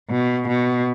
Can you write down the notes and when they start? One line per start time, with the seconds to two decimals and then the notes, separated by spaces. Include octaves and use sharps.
0.10 B2
0.48 B2